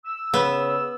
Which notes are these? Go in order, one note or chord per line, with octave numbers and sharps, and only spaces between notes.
E6
C#3 B3